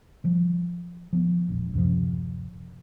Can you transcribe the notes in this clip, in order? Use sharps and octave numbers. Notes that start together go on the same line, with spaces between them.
F3 G3
F3 B3
E1 A#1
D1 F#2 C3 F3